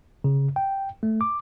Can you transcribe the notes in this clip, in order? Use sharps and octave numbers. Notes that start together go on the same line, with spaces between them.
C#3
G5
A3
D6